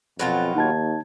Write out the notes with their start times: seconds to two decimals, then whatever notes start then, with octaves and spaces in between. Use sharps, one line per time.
0.19 F2 B2 F#3 F4
0.56 D#2 D#4 A5 G#6